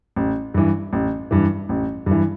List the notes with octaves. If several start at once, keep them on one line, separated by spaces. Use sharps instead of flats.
A1
G2 E3
A1
G2 E3
A1
G2 E3